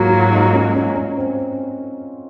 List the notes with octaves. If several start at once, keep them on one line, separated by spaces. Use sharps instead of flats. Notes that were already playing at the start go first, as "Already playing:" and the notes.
Already playing: G#2 F#3 A#3 F4 F#4
F4
D#4
C#4
C#4
C#4
C4